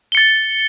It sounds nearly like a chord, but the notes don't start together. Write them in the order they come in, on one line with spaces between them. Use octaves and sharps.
G7 C#7 A6